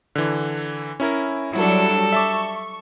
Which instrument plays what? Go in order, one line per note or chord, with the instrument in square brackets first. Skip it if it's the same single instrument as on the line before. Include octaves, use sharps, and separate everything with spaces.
[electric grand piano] D3 E3
C#4 E4 A#4
[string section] F#3 D4 [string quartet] G3 A4 [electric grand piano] E4
[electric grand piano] E5 A5 D6 [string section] C#6